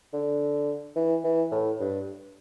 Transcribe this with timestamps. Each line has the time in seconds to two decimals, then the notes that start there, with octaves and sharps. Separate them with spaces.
0.13 D3
0.96 E3
1.24 E3
1.51 A2
1.80 G2